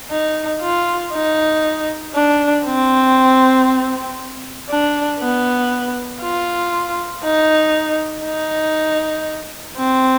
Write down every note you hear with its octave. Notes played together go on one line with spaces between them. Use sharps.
D#4
F4
D#4
D4
C4
D4
B3
F4
D#4
D#4
C4